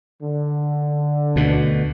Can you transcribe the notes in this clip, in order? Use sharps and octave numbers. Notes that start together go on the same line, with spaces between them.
D3
D2 B2